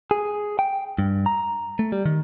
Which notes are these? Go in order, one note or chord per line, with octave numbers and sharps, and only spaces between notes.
G#4
G5
G2
A#5
A3
G3
D#3